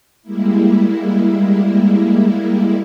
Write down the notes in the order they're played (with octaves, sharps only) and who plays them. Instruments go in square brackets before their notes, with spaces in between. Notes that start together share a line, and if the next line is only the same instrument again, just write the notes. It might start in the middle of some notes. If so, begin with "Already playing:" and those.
[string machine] G3 G#3 A#3 E4